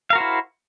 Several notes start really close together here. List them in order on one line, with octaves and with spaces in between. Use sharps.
F5 A#4 F#4 C5 E4